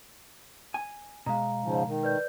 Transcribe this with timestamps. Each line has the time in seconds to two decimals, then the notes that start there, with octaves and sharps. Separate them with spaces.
0.74 G#5
1.26 B2 G#3 F5 A#5
1.64 G#2 C#3 F3
1.87 D#3
2.03 B4 D5 G6